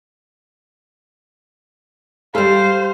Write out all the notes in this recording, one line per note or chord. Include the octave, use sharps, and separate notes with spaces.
G3 A4 C5 F5